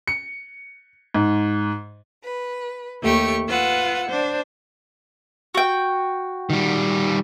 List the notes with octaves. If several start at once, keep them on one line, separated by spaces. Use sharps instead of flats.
C#7
G#2
B4
D#2 A3 G4 C#6
F4 B4 F#5 E6
D4 C5
F#4 G5
D#3 G3